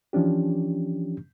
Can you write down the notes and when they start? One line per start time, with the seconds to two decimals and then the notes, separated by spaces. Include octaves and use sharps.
0.13 E3 F3 C#4 D4 G4